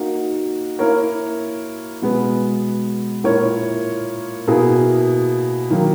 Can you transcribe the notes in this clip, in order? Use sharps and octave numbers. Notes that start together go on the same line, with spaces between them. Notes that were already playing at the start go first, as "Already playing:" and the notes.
Already playing: A#3 D#4 F#4
A#3 E4 A#4 C#5
B2 G#3 B3
A#2 A#3 E4 A#4 C#5
B2 A#3 E4 G#4
D#3 F#3 A#3